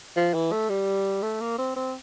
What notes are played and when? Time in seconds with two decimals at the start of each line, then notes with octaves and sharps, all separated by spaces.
0.16 F3
0.34 E3
0.52 A3
0.69 G3
1.22 A3
1.41 A#3
1.58 C4
1.76 C4